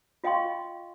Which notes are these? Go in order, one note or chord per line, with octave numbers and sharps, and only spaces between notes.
F4 D#5 F5 G5 C6 C#6